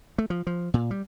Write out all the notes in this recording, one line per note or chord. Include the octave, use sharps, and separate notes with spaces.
A3
F3
F3
A#2
G3